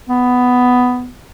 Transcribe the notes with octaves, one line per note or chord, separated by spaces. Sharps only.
B3